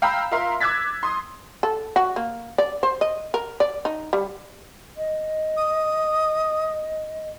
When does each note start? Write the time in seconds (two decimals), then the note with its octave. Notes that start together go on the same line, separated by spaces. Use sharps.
0.02 F5 G5 A#5 B5 E6
0.31 F4 A#4 E5 F5 C6
0.60 D6 E6 F#6 G#6 A6 B6
1.03 C6 D#6
1.63 A4
1.96 F#4
2.16 A#3
2.58 D5
2.83 C5
3.01 D#5
3.34 A#4
3.60 D5
3.85 D#4
4.13 G3
4.97 D#5
5.56 D#6